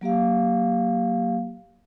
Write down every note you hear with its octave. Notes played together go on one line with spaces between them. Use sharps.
F#3 A#3 G4 F5